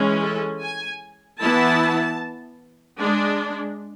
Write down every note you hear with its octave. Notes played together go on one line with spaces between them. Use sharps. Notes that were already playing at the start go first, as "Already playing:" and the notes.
Already playing: E3 G#3 C#4
A4
G#5
E3 B3 E4 A5
G#3 D4